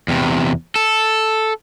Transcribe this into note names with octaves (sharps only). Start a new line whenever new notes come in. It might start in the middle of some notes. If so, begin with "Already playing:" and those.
E2 C3
A4